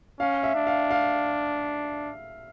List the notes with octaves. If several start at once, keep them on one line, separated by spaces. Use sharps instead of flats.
C#4 F5
E5
D4
F5
F5